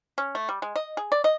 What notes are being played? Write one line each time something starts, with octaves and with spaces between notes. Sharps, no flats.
C#4
A3
G3
G#3
D#5
G#4
D5
D#5